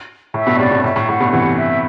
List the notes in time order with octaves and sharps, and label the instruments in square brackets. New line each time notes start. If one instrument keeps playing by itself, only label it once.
[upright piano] A2 [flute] E5
[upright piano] G2 B2
[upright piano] A2 C3 [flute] D5
[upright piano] G2 B2
[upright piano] A2 [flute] E5
[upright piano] A2
[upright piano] A2 [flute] F#5
[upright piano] G2 B2
[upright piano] C3 E3 [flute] F#5
[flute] E5